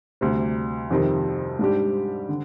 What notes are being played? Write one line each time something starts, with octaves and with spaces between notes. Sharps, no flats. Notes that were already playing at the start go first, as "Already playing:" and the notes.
D2 C3 G3
F2 C3 D#3 G3
G#2 G3 D4 G4
D3